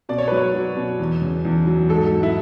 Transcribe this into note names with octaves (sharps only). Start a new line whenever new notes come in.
B2 D5
C#5
F#3 B4
C#5
F#3
B2
E2
C#3
E2
F#3
G#2 A4
F#3
E4